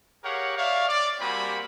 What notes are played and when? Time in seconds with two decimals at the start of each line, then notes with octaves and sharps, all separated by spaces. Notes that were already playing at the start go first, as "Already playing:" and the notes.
0.24 G4 G#4 A#4 C#5 F5 F#5
0.57 C#5 D5 E5 F5
0.88 D5
1.20 G3 A#3 C4 F#4 G#5 B5